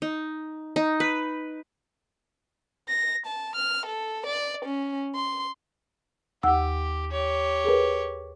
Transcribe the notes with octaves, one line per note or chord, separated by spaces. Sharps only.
D#4
D#4
B4
A#6
A5
F6
A4
D5
C#4
C6
D#2 G4 F#5 E6
G4 C#5
G#4 A#4 B4